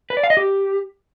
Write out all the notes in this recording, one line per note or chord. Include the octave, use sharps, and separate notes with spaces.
B4
D5
F5
D#5
G4